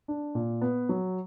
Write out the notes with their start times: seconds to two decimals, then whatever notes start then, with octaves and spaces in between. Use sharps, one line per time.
0.08 D4
0.35 A#2
0.61 B3
0.89 F#3